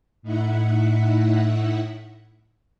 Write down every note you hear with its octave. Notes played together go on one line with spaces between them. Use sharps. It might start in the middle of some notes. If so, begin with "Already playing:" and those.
A2 D#4 E4 E5 F#5